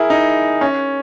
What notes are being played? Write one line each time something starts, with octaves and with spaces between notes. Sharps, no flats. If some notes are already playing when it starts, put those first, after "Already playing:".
Already playing: E4 G#4 A#4
D#4
C#4